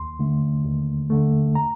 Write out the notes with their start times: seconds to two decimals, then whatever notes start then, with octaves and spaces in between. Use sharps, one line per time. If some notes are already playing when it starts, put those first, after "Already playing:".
Already playing: D#2 C6
0.19 D3 A3
0.65 D#2
1.10 D3 A3
1.55 A#5